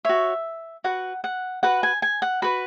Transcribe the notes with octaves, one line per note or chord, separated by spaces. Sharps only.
F#4 C#5 E5
F#4 B4 F#5
F#5
F#4 B4 F#5
G#5
G#5
F#5
F#4 B4 B5